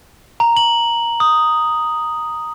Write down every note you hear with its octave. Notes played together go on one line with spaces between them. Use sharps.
A#5
F#7
D#6